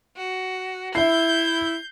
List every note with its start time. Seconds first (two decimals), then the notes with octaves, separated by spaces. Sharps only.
0.17 F#4
0.95 E4 E5 G6 C7